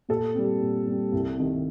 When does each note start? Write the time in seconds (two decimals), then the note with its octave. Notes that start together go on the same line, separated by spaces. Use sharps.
0.09 A#2 A4
0.35 G3 C4
0.61 A#2
0.87 G3 C4
1.12 C2
1.38 C3 D#3